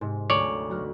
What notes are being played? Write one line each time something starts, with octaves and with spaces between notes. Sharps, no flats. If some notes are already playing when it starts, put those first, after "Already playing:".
G#2 C3
D2 G#4 C#5 D5 A#5
B1 F#4 F6